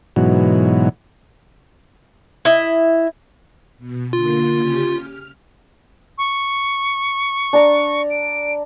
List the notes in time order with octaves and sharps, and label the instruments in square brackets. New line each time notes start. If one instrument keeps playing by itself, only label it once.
[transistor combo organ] G#2 B2 E3 F#3
[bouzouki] E4 D#5
[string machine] B2
[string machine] D3 A#3 [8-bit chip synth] F4
[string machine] C#3 C#4 G4
F6
[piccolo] C#6
[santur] D4 A#5
[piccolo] D7